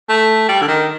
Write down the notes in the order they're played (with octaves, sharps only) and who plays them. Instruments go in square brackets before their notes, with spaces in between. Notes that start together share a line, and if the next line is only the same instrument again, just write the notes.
[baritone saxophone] A3
G3
D3
D#3